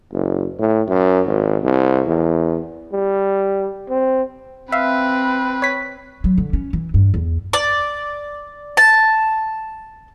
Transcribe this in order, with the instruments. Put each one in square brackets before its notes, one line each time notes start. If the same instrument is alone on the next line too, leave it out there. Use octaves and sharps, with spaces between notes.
[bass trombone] F#1
A2
F#2
G#1
C2
E2
[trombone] G3
C4
[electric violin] C4 B4 [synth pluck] E5 F5
[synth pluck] C#5 B6
[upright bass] F#3
D3
C#4
E3
G2
E2
[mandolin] D5
A5